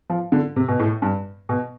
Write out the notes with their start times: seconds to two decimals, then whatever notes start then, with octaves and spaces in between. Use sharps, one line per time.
0.10 F3
0.32 D3
0.56 C3
0.68 B2
0.79 A2
1.02 G2
1.49 B2